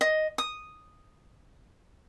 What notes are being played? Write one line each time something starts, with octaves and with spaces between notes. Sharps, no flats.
D#5
D#6